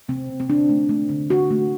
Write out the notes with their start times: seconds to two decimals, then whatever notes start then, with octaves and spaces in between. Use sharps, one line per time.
0.09 C3 C4
0.29 C3
0.40 C4
0.49 D3 D4
0.69 A3
0.89 A3
1.09 D3
1.30 D3 F#4
1.51 A3